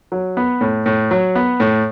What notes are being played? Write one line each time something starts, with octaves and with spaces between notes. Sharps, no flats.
F#3
B3
A2
A2
F#3
B3
A2